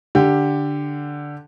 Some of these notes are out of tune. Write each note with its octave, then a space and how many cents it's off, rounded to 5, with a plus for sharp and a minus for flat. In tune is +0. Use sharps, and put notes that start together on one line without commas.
D3 +0 G4 +0